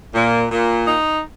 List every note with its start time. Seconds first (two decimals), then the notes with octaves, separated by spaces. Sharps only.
0.15 A#2
0.51 A#2
0.87 D#4